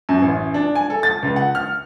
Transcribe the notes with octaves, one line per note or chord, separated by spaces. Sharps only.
F#2
A1
D4
G#5
A4
A6
C#2
F#5
F6